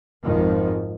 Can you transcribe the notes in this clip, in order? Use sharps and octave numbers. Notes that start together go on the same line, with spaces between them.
G#1 F2 D#3 F3